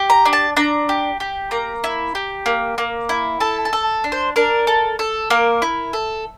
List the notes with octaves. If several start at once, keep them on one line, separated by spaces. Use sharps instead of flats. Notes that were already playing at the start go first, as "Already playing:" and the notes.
Already playing: G4
A#5
D4
A5
D4 A#5
G4
G4
A#3 A#5
E4
G4
A#3
A#3
E4
A4 A5
A5
A4
D4
C5
D4 A#4
A4
A4
A#3 A#4
E4
A4